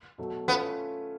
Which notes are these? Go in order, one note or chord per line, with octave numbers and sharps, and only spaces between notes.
B2 F#3 A3
A3 B3 C#4 F4